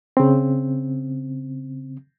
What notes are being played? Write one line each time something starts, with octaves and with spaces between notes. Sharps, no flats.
C#3 C4